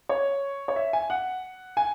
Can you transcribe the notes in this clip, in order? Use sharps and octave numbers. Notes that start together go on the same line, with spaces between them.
C#5
C#5
E5
G#5
F#5
G#5